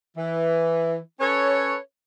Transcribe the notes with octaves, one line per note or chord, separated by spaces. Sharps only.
E3
C#4 A4 B4 C#5